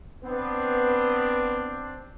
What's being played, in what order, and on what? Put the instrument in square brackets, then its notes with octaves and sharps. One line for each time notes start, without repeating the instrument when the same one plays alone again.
[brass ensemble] B3 [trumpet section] C4 D4